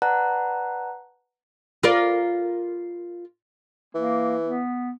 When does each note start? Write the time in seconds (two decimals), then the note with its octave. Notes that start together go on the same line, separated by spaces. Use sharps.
0.02 B4 D5 F#5 A5 A#5 F#6
1.83 F4 A#4 D5
3.95 E3 A#3
4.43 B3